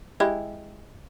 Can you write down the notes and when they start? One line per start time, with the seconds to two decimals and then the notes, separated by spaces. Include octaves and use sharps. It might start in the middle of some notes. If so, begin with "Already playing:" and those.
0.20 G#3 E4 G4